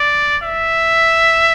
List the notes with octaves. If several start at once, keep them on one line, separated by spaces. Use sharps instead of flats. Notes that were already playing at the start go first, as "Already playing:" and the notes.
Already playing: D5
E5